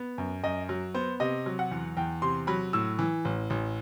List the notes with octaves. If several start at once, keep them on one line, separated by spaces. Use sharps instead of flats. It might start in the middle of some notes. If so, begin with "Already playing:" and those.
Already playing: B3
F#2
F#2 D#5
F#3
B3 C5
C3 D#5
F#3
F#5
E2
E2 G5
C3 C6
F#3 B5
A2 E6
E3
A1
A1